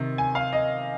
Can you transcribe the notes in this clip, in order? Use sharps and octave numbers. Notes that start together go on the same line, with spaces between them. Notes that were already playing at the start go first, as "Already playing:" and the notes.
Already playing: C3 D#3
G#5
F5
D#5